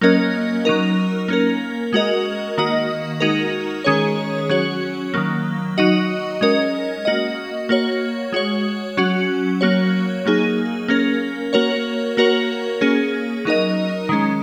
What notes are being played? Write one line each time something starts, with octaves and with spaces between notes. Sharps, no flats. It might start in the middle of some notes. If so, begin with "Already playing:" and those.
F#3 A#3 C#4 A#4 D#5
F#3 D#4 A#4
A#3 C#4 A#4
G#3 F#4 A#4 D#5
D#3 A#3 F#4 D#5
G#3 D#4 F#4 A#4
D#3 G#3 C#4 G#4 C#5
F#3 C#4 F#4 C#5
D#3 F#3 A#3
F#3 D#4 F#4 D#5
G#3 C#4 A#4 D#5
A#3 F#4 D#5
A#3 F#4 C#5
G#3 F#4 C#5
F#3 C#4 F#4
F#3 A#3 F#4 C#5
F#3 A#3 D#4 G#4
A#3 C#4 A#4
A#3 F#4 A#4 C#5
A#3 F#4 A#4 C#5
A#3 C#4 G#4
F#3 D#4 A#4 D#5
D#3 G#3 C#4